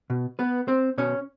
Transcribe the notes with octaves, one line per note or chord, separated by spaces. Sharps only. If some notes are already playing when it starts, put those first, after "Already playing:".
B2
B3 B4
C4 C5
B2 C#4 C#5